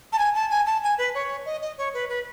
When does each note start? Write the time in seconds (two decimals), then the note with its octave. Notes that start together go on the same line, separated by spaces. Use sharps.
0.13 A5
0.19 G#5
0.35 A5
0.50 G#5
0.67 A5
0.83 G#5
0.98 B4
1.15 C#5
1.46 D#5
1.61 D#5
1.78 C#5
1.94 B4
2.09 B4